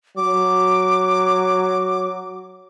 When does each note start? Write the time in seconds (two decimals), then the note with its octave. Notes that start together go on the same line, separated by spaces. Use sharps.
0.17 F#3 D6